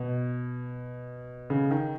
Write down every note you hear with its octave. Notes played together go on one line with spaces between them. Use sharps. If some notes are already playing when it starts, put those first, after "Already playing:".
Already playing: B2
C#3
D#3